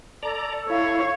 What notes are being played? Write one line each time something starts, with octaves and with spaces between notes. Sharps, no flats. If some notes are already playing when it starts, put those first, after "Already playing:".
A4 D5 A5 A#5
E4 C#5 F5